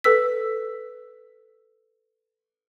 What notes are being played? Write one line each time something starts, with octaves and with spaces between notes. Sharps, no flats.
A4 B4 E6 B6